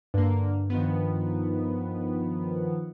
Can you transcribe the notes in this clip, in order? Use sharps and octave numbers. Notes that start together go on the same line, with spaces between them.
G2 D3 A#3
D#3 F3 B3